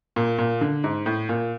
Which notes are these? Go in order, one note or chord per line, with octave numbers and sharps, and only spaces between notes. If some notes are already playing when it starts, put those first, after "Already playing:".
A#2
A#2
D3
G#2
A2
A#2